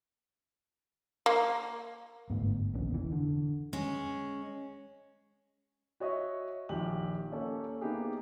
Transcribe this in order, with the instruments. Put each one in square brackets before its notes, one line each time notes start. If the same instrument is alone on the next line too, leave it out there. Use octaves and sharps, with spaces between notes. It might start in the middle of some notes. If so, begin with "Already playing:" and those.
[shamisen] A#3
[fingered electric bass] G1 G#2 A3 B3
A#1 D#2 B3 C#4
F1 E3
D3
[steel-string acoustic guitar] G#3 C#4
[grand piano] F#4 C#5 D#5 E5
A#1 D#2 G4 F#7
A#3 C#4 A4
A#3 B3 D#4 E4 G4 G#4